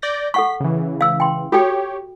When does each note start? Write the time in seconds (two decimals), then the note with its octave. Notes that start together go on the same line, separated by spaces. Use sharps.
0.02 D5 G6 A#6
0.34 A4 F#5 C#6 B6
0.60 C#3 E3
1.01 F5 E6
1.20 G5 C6
1.52 F#4 G4 A4 C#5 G5